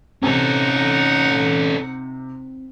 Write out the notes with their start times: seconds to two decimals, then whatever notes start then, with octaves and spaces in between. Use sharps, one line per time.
0.23 C3 C4 C#4 D#4 A4 F#5